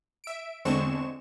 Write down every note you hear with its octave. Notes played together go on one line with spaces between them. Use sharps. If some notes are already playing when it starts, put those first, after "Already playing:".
E5 D7
E2 D3 G#3 C4 C#6 E7